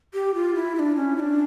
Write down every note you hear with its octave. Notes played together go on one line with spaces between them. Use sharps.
G4
F4
E4
E4
D4
C#4
E4
D4